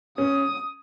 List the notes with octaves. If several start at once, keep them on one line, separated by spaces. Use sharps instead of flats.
C#4 D#6